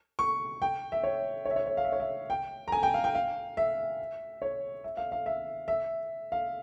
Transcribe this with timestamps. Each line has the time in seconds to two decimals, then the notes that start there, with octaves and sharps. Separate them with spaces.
0.19 C#6
0.62 G5
0.92 E5
1.03 C#5
1.45 C#5
1.51 E5
1.56 C#5
1.67 C#5
1.77 F5
1.85 E5
1.92 C#5
2.00 E5
2.30 G5
2.68 A#5
2.72 G#5
2.83 G5
2.94 F5
3.04 G5
3.15 F5
3.57 E5
4.42 C#5
4.84 E5
4.97 F5
5.12 F5
5.26 E5
5.68 E5
6.32 F5